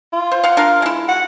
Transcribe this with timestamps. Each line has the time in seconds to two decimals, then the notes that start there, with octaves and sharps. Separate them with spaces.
0.13 F4
0.32 C5
0.43 F5 F#5
0.57 D4 A#4 F5
0.82 G#3 E4
1.08 F#5